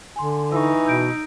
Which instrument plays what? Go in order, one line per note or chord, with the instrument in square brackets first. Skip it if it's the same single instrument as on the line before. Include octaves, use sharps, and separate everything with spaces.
[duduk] D3 [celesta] G#5 C6
[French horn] E3 [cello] D#4 [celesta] C#6 E6
[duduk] B2 [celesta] E6 G6 D7